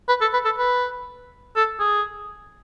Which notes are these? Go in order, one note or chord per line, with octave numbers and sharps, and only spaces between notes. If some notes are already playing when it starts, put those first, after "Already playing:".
B4
A4
B4
A4
B4
A4
G#4